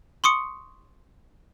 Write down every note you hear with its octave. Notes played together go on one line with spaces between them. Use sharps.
C6 C#6 D#6 C#7